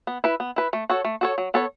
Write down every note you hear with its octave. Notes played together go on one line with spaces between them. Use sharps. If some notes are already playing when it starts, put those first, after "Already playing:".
B3
E4 B4
B3
E4 B4
A3
F#4 A4 C#5
A3
F#4 A4 C#5
F#3
B3 A4 C#5